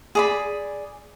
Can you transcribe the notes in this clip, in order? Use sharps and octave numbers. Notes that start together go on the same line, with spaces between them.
G#4 D5 B5